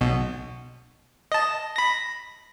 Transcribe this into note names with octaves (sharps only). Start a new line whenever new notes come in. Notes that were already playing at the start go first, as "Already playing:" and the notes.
B1 B2
D#5 A5
B5 A#6